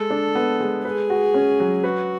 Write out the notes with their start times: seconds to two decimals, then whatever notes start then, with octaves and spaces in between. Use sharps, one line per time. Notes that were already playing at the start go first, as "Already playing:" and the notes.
Already playing: G#3 A4
0.10 D4
0.35 B3
0.60 G#3
0.85 G#4 B4
1.10 F#4
1.34 C#4
1.60 F#3
1.84 F#4 B4